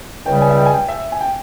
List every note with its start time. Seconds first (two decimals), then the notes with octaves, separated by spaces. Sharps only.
0.26 C#2 C#3 G3 G5
0.41 G#5
0.49 E5
0.58 G5
0.66 G#5
0.73 G5
0.88 E5
1.12 G#5
1.21 G5